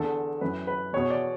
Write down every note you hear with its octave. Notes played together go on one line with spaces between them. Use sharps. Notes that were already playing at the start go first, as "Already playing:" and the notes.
Already playing: E2 D3 A4
F#2 E3 B4
B4
E2 B2 C#5
D5